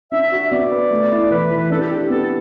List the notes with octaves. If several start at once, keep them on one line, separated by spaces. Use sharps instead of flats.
D4 E5
F#4
B3 D5
B4
A3
E4
E3 B4
E3
D4 A4
G4
G4
B3 A4
A4